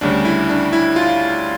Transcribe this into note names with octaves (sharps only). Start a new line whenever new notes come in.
D2 C#3 G3 D4
E4
D4
E4
F4